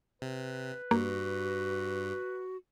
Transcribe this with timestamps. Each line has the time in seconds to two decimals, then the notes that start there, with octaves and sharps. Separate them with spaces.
0.22 C3 B4
0.91 G2 A#3 F#4